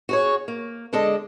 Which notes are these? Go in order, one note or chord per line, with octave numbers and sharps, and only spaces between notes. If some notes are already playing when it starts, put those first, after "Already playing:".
F#4 G#4 C#5
A#3
D3 G#3 A4 D5 D#5